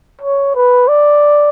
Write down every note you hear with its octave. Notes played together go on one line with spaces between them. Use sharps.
C#5
B4
D5